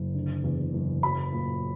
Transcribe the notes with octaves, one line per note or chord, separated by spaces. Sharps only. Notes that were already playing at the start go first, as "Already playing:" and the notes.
Already playing: F#1
D3
E2
F#1
F#3 B5
A#2